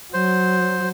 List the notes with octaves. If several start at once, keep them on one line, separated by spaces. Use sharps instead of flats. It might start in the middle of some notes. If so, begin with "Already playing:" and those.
F#3 C5